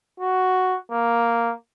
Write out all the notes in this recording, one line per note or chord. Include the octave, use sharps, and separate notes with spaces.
F#4
A#3